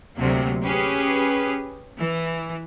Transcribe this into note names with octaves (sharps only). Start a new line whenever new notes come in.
D2 C3 F#3 A#3
C#4 G4 G#4 B4
E3